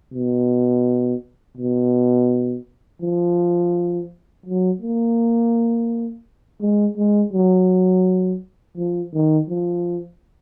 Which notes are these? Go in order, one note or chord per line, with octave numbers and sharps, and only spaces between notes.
B2
B2
F3
F#3
A#3
G#3
G#3
F#3
F3
D#3
F3